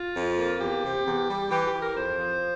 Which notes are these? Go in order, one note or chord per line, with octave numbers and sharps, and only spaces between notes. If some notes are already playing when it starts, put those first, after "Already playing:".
Already playing: F4
F2
A#3
E2 G4
C3
E2
G3
E3 G4
G4
E3
A#4
F2 C5
F3